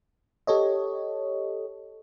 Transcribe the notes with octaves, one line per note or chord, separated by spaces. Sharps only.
G4 A4 C#5 D#5